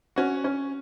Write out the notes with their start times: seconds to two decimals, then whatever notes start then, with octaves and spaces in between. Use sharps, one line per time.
0.16 C#4 F#4
0.44 C#4